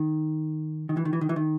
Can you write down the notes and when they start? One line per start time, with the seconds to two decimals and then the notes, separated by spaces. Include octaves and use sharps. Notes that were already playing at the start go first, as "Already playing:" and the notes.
Already playing: D#3
0.89 D#3
0.97 E3
1.05 D#3
1.13 E3
1.21 D#3
1.29 E3
1.36 D#3